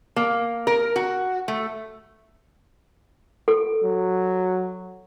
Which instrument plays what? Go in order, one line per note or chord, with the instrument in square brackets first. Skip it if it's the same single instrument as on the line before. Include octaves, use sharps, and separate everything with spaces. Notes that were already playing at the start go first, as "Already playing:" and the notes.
[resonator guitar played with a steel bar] A#3
A#4
F#4
A3
[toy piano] A4
[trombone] F#3